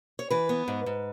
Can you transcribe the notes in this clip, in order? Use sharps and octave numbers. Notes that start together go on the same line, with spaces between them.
C#5
E3 B4
B3
G#2
G#2